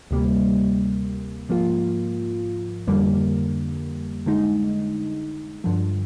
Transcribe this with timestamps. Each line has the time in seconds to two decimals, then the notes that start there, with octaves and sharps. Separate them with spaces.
0.11 D2 C3 G3 A#3
1.49 G#2 F3 A#3 F4
2.87 F2 D3 G3 A#3
4.26 D3 G#3 D#4
5.64 G2 D3 F3